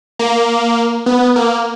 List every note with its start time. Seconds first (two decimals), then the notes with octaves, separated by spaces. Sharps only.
0.19 A#3
1.06 B3
1.36 A#3